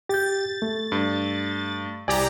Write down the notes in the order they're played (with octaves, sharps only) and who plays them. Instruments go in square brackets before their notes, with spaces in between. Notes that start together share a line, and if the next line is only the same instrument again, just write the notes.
[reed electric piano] G4 G6 [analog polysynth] A6
[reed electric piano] A3
[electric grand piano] G2
[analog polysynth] C2 G4 A#5 [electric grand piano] D5 [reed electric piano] G#5